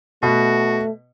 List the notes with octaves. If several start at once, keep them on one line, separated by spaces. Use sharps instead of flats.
B2 A3 F#4